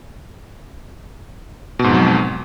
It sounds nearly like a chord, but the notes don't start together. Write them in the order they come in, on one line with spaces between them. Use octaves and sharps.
B2 G#2 F2 F#3